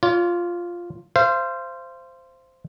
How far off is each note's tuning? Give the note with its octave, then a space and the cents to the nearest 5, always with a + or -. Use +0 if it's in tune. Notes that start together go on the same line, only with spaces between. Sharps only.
F4 +0 C#5 +45
C5 -5 F5 -35